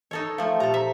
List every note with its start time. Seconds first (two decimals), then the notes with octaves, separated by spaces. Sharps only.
0.11 E3 D#4 A4 C#5
0.38 F3 A3 F5
0.60 A#2 G4 A4 A#5
0.74 C5 E5 A#5